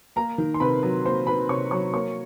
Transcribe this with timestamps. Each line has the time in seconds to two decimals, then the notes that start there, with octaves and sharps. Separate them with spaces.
0.16 A#3 A#4 A#5
0.38 D#3
0.54 C6
0.60 C3 B4 B5
0.83 F#3
1.05 A#3 C5 C6
1.27 D#3 B4 B5
1.49 C3 C#5 C#6
1.71 F#3 C#5 C#6
1.94 A#3 C#5 C#6